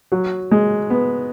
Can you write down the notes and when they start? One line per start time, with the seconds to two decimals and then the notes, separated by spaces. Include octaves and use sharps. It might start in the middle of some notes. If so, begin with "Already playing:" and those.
0.12 F#3
0.51 G#3
0.90 B3